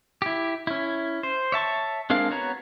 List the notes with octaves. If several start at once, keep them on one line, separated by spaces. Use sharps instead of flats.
E4 G4
C#4 E4
C5
C#5 E5 A5 C#6
G#3 C4 D4 A#4 F5
B3 F#4 C#5 A#5